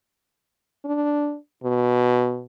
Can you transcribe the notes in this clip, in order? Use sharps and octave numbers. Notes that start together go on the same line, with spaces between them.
D4
B2